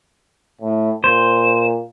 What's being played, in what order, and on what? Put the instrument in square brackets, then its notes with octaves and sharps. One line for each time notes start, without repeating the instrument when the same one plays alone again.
[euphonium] A2
[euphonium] A#2 [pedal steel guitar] C5